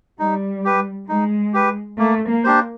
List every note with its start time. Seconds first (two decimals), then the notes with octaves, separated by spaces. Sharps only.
0.19 G3 D#4
0.65 G4 B4
1.08 G#3 D#4
1.53 G4 B4
1.99 A3 A#3
2.29 A#3
2.44 D4 G4 C5